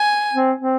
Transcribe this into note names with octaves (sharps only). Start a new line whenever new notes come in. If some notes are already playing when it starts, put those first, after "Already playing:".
Already playing: G#5
C4
C4